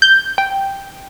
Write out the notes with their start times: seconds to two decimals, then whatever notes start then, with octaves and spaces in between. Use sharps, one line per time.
0.02 G6
0.38 G5